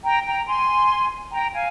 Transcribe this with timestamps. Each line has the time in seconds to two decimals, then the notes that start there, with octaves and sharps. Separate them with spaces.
0.04 G5 A#5
0.26 G5 A#5
0.47 G#5 C6
1.32 G5 A#5
1.54 F5 G#5